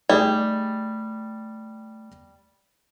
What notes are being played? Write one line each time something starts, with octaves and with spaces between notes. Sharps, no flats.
G3 A3 D#4 G4 G#4 D5